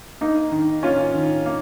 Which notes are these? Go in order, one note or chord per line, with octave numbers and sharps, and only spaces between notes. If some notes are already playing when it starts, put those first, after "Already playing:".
A#3 D#4
D#3
A#3 C#4 F4
D#3
A#3